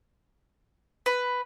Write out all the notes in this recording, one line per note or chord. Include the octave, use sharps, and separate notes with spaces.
B4